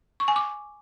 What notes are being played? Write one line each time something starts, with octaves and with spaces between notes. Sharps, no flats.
C#6
G#5
D6